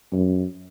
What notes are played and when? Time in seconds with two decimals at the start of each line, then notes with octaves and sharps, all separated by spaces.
0.13 F#2